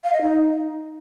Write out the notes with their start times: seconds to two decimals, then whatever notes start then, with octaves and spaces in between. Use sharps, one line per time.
0.04 F5
0.13 D#5
0.22 D#4